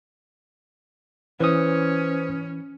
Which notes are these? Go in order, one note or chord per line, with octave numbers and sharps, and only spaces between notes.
E3 C#4 B4 C5 D#6